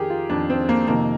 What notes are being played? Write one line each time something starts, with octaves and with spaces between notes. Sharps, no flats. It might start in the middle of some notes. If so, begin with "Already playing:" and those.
Already playing: F2 D#3 G4 G#4 A#4
F4
F2 D#3 D4
C4
A#3
F2 C3 D#3 A#3